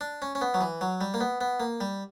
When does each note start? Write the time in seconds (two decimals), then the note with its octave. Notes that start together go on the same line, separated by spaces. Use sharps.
0.01 D4
0.22 C#4
0.35 C#4
0.41 B3
0.54 F#3
0.61 E3
0.81 F#3
1.01 G3
1.14 A#3
1.21 B3
1.41 B3
1.60 A#3
1.81 G3